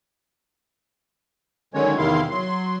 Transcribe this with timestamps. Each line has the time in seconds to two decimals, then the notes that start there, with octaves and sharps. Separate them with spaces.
1.74 D3 D#3 F#3 G#3 C#4 C#5
1.98 E2 C3 D#3 E4 F5 C6
2.31 F#3 C6